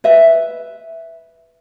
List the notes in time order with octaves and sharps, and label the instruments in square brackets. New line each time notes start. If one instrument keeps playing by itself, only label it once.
[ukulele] B4 E5